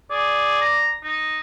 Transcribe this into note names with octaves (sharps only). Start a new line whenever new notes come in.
G#4 D5
A#5
D#4